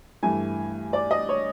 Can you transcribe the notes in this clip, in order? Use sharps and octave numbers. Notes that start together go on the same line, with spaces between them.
G2 E3 A3 G#5
D5
D#5
C#5